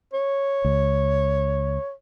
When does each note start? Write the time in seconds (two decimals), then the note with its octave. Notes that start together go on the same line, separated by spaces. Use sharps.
0.13 C#5
0.65 C#2